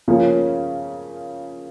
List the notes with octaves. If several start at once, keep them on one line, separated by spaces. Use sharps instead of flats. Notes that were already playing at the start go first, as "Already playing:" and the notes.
C#3 F3 A#3 C#4